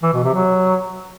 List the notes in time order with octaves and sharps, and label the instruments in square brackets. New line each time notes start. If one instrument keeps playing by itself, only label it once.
[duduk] E3
B2
C3
F#3